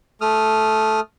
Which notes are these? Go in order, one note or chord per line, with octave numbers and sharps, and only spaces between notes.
A3 D#6 F6